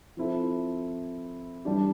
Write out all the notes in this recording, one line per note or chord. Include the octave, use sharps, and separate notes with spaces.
F3 C4 E4 A4
E3 G3 D4 G4